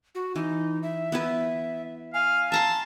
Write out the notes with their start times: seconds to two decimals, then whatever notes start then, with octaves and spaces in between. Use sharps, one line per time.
0.15 F#4
0.36 E3 D#4
0.83 E5
1.12 B3 E4 B4
2.14 F5 G#5
2.52 E5 A5 A#5 C6